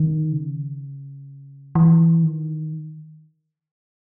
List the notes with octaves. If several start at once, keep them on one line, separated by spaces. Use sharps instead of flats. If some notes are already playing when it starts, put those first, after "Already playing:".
Already playing: D#3
C#3
E3
D#3